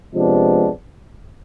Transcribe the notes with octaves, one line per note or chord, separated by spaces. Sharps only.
C3 F3 G#3 B3 D4